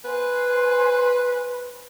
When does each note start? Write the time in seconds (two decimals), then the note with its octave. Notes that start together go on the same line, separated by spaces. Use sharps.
0.05 B4 C5 G#5